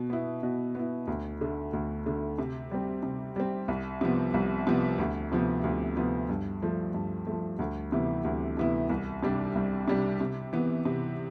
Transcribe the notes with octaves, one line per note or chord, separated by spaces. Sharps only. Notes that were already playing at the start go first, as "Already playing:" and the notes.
Already playing: B2
B3 E4
B2
B3 E4
D2
D3 A3
D2
D3 A3
C3
G3 C4
C3
G3 C4
C2
C3 F3 B3
C2
C3 F3 B3
D2
C3 F3 B3
D2
C3 F3 B3
G2
F3 A3
G2
F3 A3
D2
C3 E3 B3 E4
D2
C3 E3 B3 E4
C2
C3 G3 D4
C2
C3 G3 D4
C3
E3 B3
C3